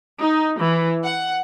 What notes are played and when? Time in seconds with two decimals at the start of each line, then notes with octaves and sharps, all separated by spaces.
0.21 D#4
0.60 E3
1.03 F#5